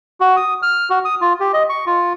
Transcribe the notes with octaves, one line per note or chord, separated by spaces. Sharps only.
F#4
D#6
F6
F#4
D#6
F4
G4
D#5
C#6
F4